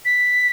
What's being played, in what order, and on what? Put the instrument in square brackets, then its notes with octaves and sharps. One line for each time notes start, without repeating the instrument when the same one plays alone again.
[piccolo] B6